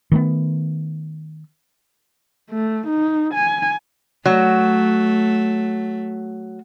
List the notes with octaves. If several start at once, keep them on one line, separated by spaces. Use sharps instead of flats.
D#3 A3 B3
A3
D#4
G#5
F#3 A3